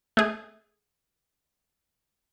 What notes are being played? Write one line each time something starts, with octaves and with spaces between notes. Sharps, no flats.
A3 G#4